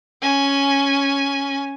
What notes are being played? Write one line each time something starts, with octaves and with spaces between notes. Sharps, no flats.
C#4 G#5